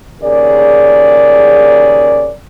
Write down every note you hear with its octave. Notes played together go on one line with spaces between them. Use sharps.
D#2 C#3 G#4 A#4 D5